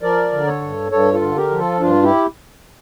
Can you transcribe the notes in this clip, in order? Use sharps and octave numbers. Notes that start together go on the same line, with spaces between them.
F3 A#4 D5
D3
A4 C#5
G2
G2 A4 C#5
F4 A4
D3
G4 A#4
F3
F4 A4
G2 D4 F4
E4 G4